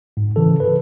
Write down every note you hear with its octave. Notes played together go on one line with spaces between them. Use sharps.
G#2
C#3 E3 A4
A4 B4